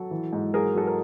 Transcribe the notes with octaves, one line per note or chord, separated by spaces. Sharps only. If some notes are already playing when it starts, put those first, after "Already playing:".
Already playing: F#3 A4
E3
G#2
F#3 G#4 A#4
F#3 A4
A#4